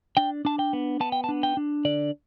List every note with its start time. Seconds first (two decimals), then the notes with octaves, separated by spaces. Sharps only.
0.17 D4 G5
0.45 D4 A5
0.59 G5
0.73 B3
1.00 B3 A5
1.12 G5
1.24 A5
1.29 D4
1.43 G5
1.57 D4
1.85 D3 D5